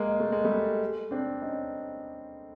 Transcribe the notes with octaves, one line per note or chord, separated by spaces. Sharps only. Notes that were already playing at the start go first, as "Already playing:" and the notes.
Already playing: G#3 A#3
A3
G#3
G3 A3
C4 D4
C#4 D#4